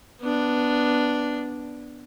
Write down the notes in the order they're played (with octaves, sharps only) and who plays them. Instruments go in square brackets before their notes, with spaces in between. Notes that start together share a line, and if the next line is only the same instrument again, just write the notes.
[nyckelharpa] B3 D4